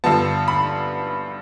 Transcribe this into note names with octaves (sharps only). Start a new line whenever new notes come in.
G2 D3 F3 B3 A5
B5